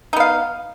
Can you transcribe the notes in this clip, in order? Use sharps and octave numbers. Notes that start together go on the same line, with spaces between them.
B3 D#4 F5